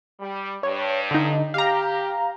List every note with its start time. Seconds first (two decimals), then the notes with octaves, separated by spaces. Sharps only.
0.20 G3
0.63 G2 C#5
1.11 D3 D#4
1.54 G4 F5 A#5